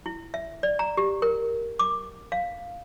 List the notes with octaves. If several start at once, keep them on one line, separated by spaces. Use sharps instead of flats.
E4
E5
D5
A#5
G4
A#4
D6
F5